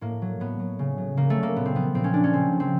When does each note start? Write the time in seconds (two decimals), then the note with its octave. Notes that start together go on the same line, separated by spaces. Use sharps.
0.01 A2 A#3
0.22 F#3
0.40 A2 B3
0.59 F#3
0.79 C#3
0.98 F#3
1.17 C#3 A#3
1.30 A3
1.37 F#3
1.43 A#3
1.56 A#2 B3
1.66 C4
1.75 F3 B3
1.94 A#2 C4
2.04 C#4
2.13 F3 D4
2.24 C#4
2.33 C#3 C4
2.53 F3
2.60 C4